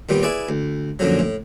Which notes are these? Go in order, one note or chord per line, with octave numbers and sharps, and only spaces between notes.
D#2 A#2 G3 B3
E4 G#4 B4 D5
D2
F#2 A#2 D3 F3 F#3
A2